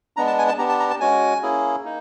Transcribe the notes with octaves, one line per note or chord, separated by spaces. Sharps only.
G#3 B3 D4 A#5
A5
G#5
A5
B3 D4 G4 A#5
A5
A#5
A5
G#3 C#4 F#4 G#5
A#3 C#4 E4 G#4
A#3 D#4